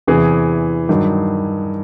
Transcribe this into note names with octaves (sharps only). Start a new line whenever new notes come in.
E2 C3 E3 G#4
G2 D#3 F#3